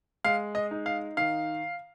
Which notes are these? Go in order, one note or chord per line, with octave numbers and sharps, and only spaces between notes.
G#3 F5
D#5
D#4
F5
D#3 F5